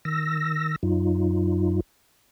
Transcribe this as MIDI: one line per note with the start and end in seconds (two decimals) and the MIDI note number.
0.05 0.76 51
0.05 0.76 88
0.05 0.76 94
0.83 1.80 42
0.83 1.80 54
0.83 1.80 63
0.83 1.80 65